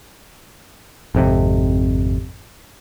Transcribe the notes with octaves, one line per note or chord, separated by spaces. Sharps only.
G#1 F2 C3